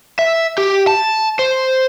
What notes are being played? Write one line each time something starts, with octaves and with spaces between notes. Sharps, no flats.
E5
G4
A5
C5